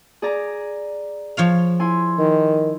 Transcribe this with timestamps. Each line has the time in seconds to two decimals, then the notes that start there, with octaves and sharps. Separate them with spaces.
0.22 G#4 D5 A#5
1.37 F3 C#5 F5
1.79 E4 G#5 C6
2.18 D#3